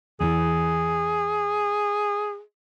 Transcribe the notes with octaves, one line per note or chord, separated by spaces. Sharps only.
E2 E3 G#4